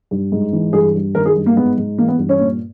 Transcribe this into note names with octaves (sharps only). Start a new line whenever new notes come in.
G2
G#2
E3
G2 G#4
G2
D#3 A#4
G#4
G2
A#3
G#2 B3
G#2
E3 A#3
B3
G2
C#4
A#2